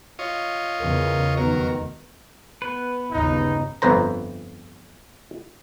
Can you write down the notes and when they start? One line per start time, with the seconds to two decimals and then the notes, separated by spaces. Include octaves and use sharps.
0.19 F4 C#5 D#5
0.80 E2 C#3 A#4
1.37 F1 D#3 F#3 B3 A#4
2.62 B3 B4
3.11 G1 D#2 C#3 D#4
3.82 G1 F2 B4 C5 A#5